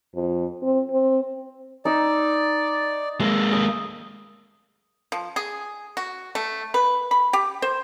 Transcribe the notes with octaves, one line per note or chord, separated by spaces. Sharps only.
F2
C4
C4
D#4 D5 E6
G#3 A#3 D#5 E6
D#6
F3
G#4
F#4
A3
B4
B5
G4
C5